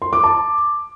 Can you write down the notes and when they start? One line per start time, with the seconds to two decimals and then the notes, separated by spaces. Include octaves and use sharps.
0.02 C6
0.13 D6
0.24 A5